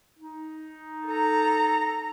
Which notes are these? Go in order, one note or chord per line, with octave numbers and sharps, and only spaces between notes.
D#4
A4 A#5